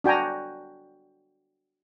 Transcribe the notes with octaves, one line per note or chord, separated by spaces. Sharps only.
D4 F#4 G5 G#5 A#5